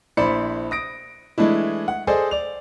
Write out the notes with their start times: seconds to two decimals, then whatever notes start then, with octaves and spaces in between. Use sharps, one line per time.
0.17 A#1 E4 C5 D5 B5 C#7
0.71 D#6 A#6 D7
1.38 E3 G#3 A3 D4 E4
1.88 F#5
2.07 G#4 A4 C5 D5 D#5 G#5
2.31 D5 F7